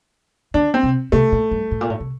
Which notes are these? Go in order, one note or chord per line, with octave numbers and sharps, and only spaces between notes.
D3 D4
C4
C3
C3 A3
A#2
G2
A2
A#2
A2
C3